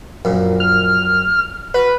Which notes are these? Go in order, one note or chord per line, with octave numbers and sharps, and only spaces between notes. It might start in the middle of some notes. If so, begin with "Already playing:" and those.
A#1 F#2 A#2
F6
F#4 B4